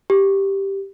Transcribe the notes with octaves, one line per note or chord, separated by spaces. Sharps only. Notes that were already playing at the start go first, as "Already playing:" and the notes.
G4